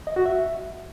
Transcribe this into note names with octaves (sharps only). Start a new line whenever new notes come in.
D#5
F#4
E5